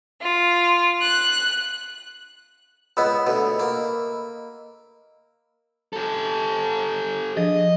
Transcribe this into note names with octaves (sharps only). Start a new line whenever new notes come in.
F4
F#6
C#2 B3 D#5 B5 E6
D2 B2
A#3
G4 A4
F3 D4 G#4 D#5